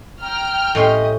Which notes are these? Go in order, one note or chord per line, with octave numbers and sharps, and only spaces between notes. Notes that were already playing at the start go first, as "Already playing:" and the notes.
G5 A#5 F6
A2 C#4 G4 D#5 C6